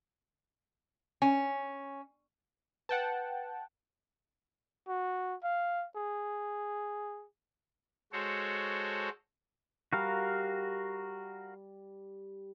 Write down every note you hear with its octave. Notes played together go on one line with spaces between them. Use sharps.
C#4 G#5
B4 F#5 G5 A5
F#4
F5
G#4
G#3 F#4 A4 C5 C#5
G3 F#4 A#4 F5